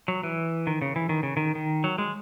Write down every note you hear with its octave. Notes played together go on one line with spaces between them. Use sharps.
F#3
E3
D#3
C#3
E3
D#3
C#3
D#3
D#3
F#3
G#3